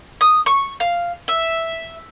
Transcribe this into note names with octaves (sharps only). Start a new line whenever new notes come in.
D#6
C#6
F5
E5